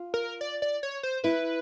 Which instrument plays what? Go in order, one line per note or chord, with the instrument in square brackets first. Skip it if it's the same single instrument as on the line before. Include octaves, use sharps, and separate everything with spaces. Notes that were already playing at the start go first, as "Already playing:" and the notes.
Already playing: [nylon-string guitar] F4
[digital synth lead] A#4
D5
D5
C#5
C5
[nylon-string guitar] E4 [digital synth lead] B4